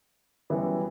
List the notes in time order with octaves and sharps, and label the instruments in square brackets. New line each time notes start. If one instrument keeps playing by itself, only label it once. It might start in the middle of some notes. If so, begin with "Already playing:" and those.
[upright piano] F#2 E3 G3 B3 E5